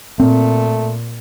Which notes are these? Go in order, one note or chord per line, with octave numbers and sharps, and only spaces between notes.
A#2 A3 C4